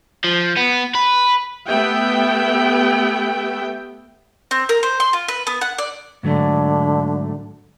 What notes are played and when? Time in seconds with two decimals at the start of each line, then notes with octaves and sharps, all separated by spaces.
0.25 F3
0.57 B3
0.95 B4
1.67 A3 B3 G4 E5 G5
4.51 C4
4.69 A#4
4.83 C5
5.00 C6
5.13 F4
5.28 B4
5.47 B3
5.61 F#5
5.78 D5
6.23 G#2 D3 F#3 A3